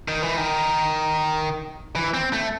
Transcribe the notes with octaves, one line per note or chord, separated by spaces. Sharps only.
D#3
E3
D#3
E3
C4
A3